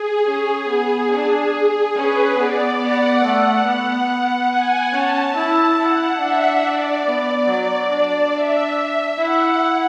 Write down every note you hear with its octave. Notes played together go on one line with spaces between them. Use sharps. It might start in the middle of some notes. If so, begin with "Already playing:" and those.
Already playing: G#4
C#4 G#4
B3 G#4
D4
G#4
C#4 B4
B3 D5
B3 F#5
A3 F#5
B3
F#5
G#5
C#4 A5
E4
E4 F#5
D4 E5
D5
B3
F#3
D4
E5
E4 F#5